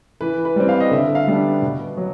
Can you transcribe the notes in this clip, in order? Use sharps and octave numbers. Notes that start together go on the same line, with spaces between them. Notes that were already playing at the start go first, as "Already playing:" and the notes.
E3 B4
B4
G3 C4
F5
D#5
D3 E5
F5
G3 B3 D4
B2
F#3